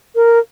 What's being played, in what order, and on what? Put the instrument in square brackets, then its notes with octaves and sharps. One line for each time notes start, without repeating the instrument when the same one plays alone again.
[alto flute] A#4